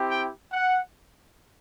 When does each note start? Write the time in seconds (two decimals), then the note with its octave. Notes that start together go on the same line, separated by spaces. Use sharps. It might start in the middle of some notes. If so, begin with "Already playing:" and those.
Already playing: C4 E4 G4
0.10 G5
0.52 F#5